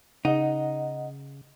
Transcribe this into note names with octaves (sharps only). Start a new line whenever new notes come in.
C#3 D#4 D#5 F#5